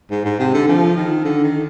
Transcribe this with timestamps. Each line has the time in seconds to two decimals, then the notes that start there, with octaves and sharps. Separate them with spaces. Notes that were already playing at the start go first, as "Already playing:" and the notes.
0.11 G#2
0.25 G#2
0.40 C3
0.54 D3
0.68 F3
0.96 D#3
1.24 D3
1.44 D#3